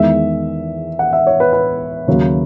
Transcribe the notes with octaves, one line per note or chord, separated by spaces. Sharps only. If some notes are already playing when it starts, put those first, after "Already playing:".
Already playing: E2 D#3 G#3 E5
F#5
E5
C#5
B4
B4
D#2 C#3 F#3 A#3